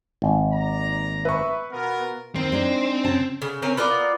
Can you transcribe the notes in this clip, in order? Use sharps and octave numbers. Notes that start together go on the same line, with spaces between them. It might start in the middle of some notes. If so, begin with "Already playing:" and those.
G#1
D#2 D5 A#5
B4 E5 C#6
B2 B3 F4 A#4
D#2 D#3 C4
G#3 D4 D#4
C#3 A5
C#3
C4 C#4 A#4 G#5
B3 F4 A#4 D5